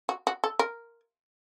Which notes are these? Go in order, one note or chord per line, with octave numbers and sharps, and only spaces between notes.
F#4
F#4
A4
A#4